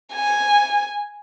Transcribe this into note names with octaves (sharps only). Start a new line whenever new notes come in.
G#5